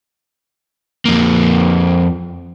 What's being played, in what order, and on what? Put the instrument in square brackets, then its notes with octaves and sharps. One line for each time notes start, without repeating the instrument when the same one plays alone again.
[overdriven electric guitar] F2 A#3